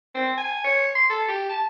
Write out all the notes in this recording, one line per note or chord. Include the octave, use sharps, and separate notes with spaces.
C4
G#5
C#5
C6
A4
G4
A5